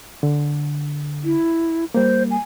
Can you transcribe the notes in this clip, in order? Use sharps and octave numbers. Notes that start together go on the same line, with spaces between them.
D3
E4
G3 A#3 C5
G#5